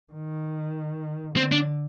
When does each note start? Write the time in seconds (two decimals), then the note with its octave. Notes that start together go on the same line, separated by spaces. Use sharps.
0.13 D#3
1.36 D3 C4
1.52 D4